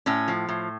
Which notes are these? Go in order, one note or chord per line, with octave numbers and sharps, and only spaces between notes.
A2 C#4
F3
A2